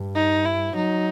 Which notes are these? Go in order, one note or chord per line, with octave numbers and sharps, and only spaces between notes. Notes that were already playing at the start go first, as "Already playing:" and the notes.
Already playing: G2
D#4
E4
F#3 D#4